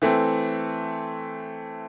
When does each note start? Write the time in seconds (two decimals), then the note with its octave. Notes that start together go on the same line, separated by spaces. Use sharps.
0.02 E3 A3 C4